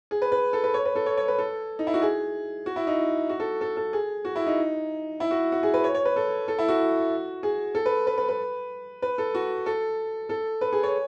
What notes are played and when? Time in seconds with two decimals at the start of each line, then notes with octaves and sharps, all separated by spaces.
0.11 G#4
0.22 B4
0.32 B4
0.53 A4
0.64 B4
0.74 C#5
0.85 B4
0.95 A4
1.06 C#5
1.17 C#5
1.28 B4
1.38 A4
1.79 D#4
1.87 E4
1.94 F#4
2.02 G#4
2.66 F#4
2.76 E4
2.87 D#4
3.29 F#4
3.40 A4
3.61 A4
3.77 A4
3.93 G#4
4.25 F#4
4.36 E4
4.47 D#4
5.20 E4
5.31 F#4
5.52 F#4
5.63 G#4
5.74 B4
5.84 C#5
5.95 C#5
6.05 B4
6.16 A4
6.48 A4
6.59 E4
6.68 F#4
7.43 G#4
7.75 A4
7.86 B4
8.07 B4
8.18 B4
8.29 B4
9.02 B4
9.18 A4
9.35 F#4
9.66 A4
10.29 A4
10.61 B4
10.73 G#4
10.83 C#5